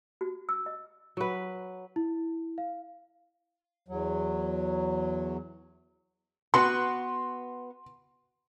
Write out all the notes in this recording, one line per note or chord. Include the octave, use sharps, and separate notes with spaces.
F#4
E6
D#5
F#3 B4
E4
F5
E2 F#3
B3 F#4 B4 C6